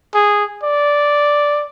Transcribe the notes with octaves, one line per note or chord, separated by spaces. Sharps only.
G#4
D5